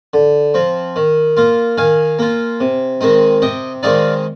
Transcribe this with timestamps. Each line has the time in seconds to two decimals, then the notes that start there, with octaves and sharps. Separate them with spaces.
0.14 D3
0.54 F3 C4
0.96 D#3
1.37 A#3 F4
1.78 D#3 F5 G#5
2.19 A#3 F4
2.60 C3
3.01 D#3 G#3 C4 D#4
3.42 C3 D#5 G5
3.83 D#3 G#3 C4 D#4 D5 F5